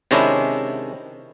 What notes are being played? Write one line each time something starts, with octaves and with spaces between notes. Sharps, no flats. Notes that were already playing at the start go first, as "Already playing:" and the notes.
C3 D#3 G#3 C#4 D4 E4